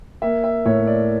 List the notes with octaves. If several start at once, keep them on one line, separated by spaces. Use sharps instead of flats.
A#3 E5
E5
A2 C#5
D5